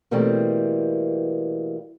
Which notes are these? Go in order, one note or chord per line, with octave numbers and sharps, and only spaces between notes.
B2 E3 G3 A3 A#3 C4